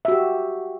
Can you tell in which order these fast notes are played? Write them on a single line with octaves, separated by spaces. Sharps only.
E5 F#4 G4